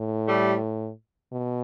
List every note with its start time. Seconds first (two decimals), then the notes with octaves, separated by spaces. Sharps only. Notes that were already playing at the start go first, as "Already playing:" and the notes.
Already playing: A2
0.28 G3 A3
1.32 B2